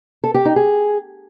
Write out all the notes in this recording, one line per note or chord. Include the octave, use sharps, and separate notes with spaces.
A4
G4
D#4
G#4